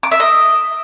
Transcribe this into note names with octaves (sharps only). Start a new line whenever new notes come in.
D6
E5
D#5